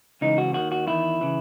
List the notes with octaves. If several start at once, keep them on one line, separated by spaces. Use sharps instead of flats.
C#2 C#3 E3 D#4
F#4
D#2 D#3 F#4
F#4
E2 D#3 E4
C#3 E3